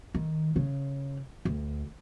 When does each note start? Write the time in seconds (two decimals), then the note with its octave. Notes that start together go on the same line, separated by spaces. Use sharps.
0.14 D#3
0.56 C#3
1.45 D2